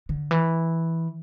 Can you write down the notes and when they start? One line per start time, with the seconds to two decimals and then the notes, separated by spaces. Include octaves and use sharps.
0.09 D3
0.31 E3